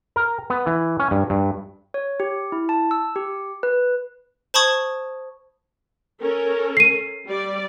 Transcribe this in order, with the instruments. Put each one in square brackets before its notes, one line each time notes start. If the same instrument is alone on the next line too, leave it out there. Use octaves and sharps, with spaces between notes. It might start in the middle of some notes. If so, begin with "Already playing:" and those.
[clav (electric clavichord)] A#4
B3
E3
C#4
G2
G2
[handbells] C#5
G4
E4
A5
E6
G4
B4
[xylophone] C5 A5 B5 C#6 D#6 G#6
[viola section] C#4 A4 A#4
[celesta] C7 D#7
[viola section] G3 D5